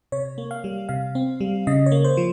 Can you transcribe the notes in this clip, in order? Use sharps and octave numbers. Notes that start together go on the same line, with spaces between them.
C3 C#5
A#3
F5
G3
C3 F5
C4
G3
C#3 D#5
C#5
A#3
C5
F3